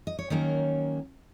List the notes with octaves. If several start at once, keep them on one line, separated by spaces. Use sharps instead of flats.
D#5
C#5
D#3 F#3 A#3 C#4 A#4